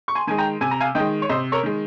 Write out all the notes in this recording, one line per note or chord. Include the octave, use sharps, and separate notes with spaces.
C#6
G#5 C6
D#3 G#3 G#5
G5 A#5
C3 G#5
A#5
F5 G#5
D#3 G#3 D#5 G5
C#5
C3 C5 D#5
A#4 C#5
D#3 G#3